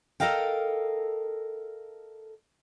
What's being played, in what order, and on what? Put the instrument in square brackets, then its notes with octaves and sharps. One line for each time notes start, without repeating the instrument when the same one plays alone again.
[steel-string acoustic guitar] A4 A#4 D#5 F5 G5